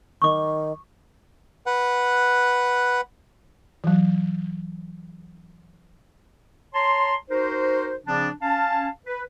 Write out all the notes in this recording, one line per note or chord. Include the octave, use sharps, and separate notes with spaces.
D#3 C#6 D6
B4 F#5
E3 F#3
C#5 A5 A#5 C6
D#4 F#4 A#4 C5
C#3 F3 C4 D4
C#4 F5 A5
B4